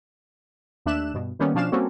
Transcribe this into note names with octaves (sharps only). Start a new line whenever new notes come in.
D#2 A3 D4 E5 F#6 E7
G2 B2
D#3 G3 A#3 B3 C#4
B2 F3 C#4 D4 F5 E7
G3 A#3 C4 C#4 F#4 A4